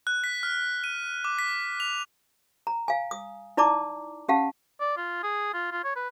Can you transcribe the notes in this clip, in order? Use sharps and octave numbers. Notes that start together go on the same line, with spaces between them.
F#6
B6
F6
D#7
D6
B6
F7
A#5
F5 G#5
D#6
D#4 E4 D5 A5 A#5 D6
C#4 G4 F5 F#5 A5
D5
F4
G#4
F4
F4
C#5
B4